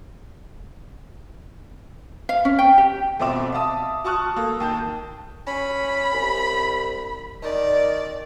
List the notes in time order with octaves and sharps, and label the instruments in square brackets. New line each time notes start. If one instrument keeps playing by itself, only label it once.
[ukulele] F5
C#4
G5
G4
[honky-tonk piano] F2 B2 C4 E5 D6 E7
E5 F5 A5 D#6
F#4 A5 C#6 D#6 F6 F#6
A#3 A4
D#2 A5 G6
[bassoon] C#4 [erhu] B5
[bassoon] C2
[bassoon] D#3 [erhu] D5